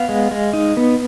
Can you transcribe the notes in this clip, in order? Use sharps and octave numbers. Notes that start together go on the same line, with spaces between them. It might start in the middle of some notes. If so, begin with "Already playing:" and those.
Already playing: B3 F5
G#3
G#3
D#4
B3